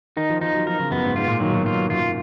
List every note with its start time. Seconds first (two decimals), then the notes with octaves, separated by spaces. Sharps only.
0.17 D#3 D#4
0.30 F3
0.41 F3 D#4
0.54 F#3
0.66 F3 A#4
0.79 C#3
0.91 F#2 B3
1.04 G#2
1.16 G#2 F4
1.28 A#2
1.40 D#3 F#3
1.53 B2
1.66 A#2 F4
1.90 F#2 F4